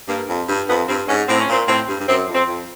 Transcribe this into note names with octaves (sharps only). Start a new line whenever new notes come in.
G2 A#3
F2
G2
F2 B3
G2 C4
G#2 C#4
A2 C4
C#4
A#2 C4
A2 C4
G2
G2
F#2 C4
F2
C4
F2